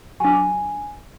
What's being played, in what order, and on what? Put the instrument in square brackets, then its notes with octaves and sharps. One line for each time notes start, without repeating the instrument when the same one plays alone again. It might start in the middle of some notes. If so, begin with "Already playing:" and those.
[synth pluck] F#3 D4 [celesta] G#5